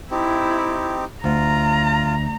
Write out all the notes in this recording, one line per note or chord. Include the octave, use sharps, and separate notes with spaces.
C4 D#4 E4 G4
D2 F4 A#5